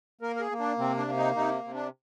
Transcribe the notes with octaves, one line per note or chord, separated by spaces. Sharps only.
A#3 A#4
A#4
G#4
A#3
D4
C3 C4
D4
A#3
D#4
C3 D#4
C3
D4